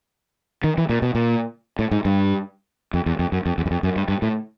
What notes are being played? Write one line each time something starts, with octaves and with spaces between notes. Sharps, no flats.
D#3
E3
A#2
B2
A#2
A2
G#2
G2
F2
E2
F2
F#2
F2
E2
F#2
F2
F#2
G2
G2
A2